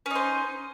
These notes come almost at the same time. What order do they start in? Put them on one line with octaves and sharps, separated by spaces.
C#4 D#4 C5